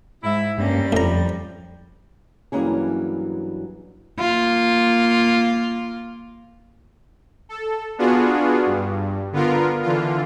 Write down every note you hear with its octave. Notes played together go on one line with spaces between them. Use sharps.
G#2 E4
G2 G3 A#3 C#4
F2 A2 F3 A#5
G2 E3 F#3 A#3 C#4 G#4
A#3 F4
A4
B3 D4 F4 F#4 G#4
G2
D3 B3 F4 A#4
D3 E3 F4